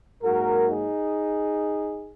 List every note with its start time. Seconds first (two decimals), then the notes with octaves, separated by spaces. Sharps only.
0.23 G#2 F#3 A#3 F#4 A#4
0.68 D#4 G#4